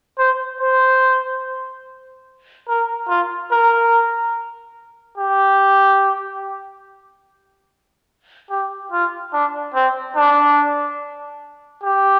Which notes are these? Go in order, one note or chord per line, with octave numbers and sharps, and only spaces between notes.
C5
C5
A#4
F4
A#4
G4
G4
F4
D4
C4
D4
G4